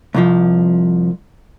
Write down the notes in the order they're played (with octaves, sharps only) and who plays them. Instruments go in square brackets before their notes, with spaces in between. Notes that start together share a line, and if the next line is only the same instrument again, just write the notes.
[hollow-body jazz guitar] C2 F2 F3